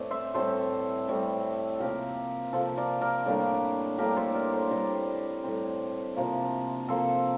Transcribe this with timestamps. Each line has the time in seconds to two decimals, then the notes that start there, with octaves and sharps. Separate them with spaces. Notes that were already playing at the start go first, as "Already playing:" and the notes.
Already playing: A2 E3 A3 C4 E4 D5
0.11 C5 E5
0.34 A2 G3 C4 A4 C5
1.08 A2 G3 C4
1.80 C3 F3 A#3 G4 A#4
2.53 C3 F3 A#3 A4 C5
2.77 A#4 D5
3.01 A#4 D5
3.26 A2 G3 A#3 D4
3.98 A2 G3 A#3 D4 G4 A#4
4.16 A4 C5
4.34 A#4 D5
4.52 A4 C5
4.71 A2 G3 C4 G4 A#4
5.44 A2 G3 C4
6.17 C3 F3 A#3
6.89 C3 F3 A#3 A4 C5